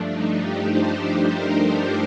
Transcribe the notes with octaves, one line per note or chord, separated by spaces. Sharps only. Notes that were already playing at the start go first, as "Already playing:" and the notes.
Already playing: G2 F3 A3 D4
D#4
G4
C5
A#4
A#4